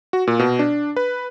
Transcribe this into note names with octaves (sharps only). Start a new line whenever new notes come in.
F#4
A#2
B2
D4
B4